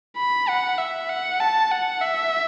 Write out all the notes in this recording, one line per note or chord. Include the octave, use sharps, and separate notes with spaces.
B5
F#5
E5
F#5
A5
F#5
E5